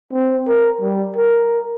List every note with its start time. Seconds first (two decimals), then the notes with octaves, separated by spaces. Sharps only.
0.12 C4
0.47 A#4
0.81 G3
1.17 A#4